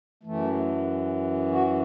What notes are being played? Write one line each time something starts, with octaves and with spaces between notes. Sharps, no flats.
F#2 E3 A3
F#4